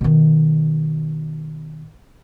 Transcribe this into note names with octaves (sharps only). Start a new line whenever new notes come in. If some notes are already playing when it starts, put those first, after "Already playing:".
B2 D#3